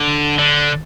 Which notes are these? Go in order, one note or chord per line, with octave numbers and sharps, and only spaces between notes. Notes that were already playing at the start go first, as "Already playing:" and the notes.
Already playing: D3
D3